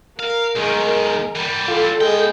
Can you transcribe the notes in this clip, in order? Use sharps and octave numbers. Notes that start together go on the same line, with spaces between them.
A#4 F5
B1 D#3 G#3
E3 G3
F4 A4
G#3 B3 G5